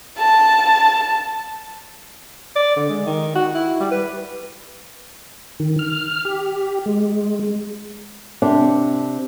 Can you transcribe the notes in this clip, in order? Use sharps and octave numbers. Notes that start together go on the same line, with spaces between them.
A5
D5
D3
G#3
D#3
F#4
E4
G3
B4
D#3
F6
G4
G#3
C3 D4